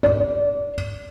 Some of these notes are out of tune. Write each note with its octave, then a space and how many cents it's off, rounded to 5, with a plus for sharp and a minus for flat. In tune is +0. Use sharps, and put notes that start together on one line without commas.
D5 -25